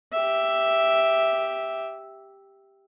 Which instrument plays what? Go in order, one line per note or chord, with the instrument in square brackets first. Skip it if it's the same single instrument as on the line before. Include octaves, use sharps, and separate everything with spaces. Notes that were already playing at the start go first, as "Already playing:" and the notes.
[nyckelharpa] G4 E5